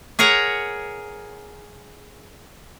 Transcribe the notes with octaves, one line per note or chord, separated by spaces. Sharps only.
G#4 A#4 C#5 F#5 A#5